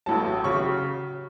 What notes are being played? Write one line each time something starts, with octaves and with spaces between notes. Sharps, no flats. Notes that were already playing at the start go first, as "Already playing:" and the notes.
A1 A2 F#3 A5
C#3 F#3 C#6